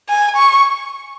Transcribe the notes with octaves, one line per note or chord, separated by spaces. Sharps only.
G#5
C#6